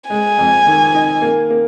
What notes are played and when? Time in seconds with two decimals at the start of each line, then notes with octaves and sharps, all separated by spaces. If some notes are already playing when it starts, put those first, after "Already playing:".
0.10 G#3 G#5
0.38 F2
0.67 D#3
0.94 D#4
1.22 A#3
1.50 A#3